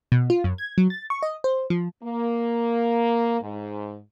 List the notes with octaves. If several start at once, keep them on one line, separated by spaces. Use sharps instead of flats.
B2
F4
F#2
G#6
F#3
A6
C#6
D#5
C5
F3
A#3
G#2